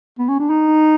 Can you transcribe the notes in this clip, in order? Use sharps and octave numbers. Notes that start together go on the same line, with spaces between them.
B3
C#4
D4
D#4